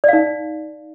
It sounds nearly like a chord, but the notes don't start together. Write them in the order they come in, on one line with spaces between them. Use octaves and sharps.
D5 F5 D#4